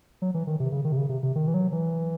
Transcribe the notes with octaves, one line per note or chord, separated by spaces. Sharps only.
F#3
E3
D#3
C3
C#3
D#3
C3
C#3
C3
C3
D#3
E3
F#3
E3